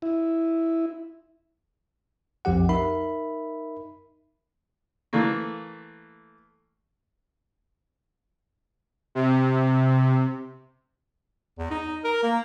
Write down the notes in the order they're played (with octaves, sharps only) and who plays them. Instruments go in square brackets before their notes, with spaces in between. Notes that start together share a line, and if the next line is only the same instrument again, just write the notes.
[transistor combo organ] E4
[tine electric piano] B1 F2 F3 G4 F#5
D#4 A#4 E5 B5
[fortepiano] E3 A3 A#3
[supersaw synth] C3
[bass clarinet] E2
D#4
A#4
A#3